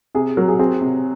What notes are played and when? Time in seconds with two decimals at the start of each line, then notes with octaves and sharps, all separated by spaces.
0.15 C3 G#4
0.37 F#3 A#4
0.48 G#4
0.59 C4 G#4
0.81 C3